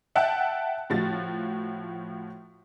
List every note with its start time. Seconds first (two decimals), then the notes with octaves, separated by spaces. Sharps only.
0.15 E5 F#5 G5 A5 F#6
0.90 A2 F3 F#4 A6